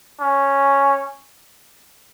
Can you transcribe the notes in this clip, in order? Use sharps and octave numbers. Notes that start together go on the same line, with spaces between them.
C#4